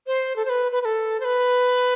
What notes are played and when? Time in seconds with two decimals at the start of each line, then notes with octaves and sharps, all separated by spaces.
0.07 C5
0.36 A4
0.45 C5
0.49 B4
0.72 B4
0.82 B4
0.85 A4
1.20 C5
1.24 B4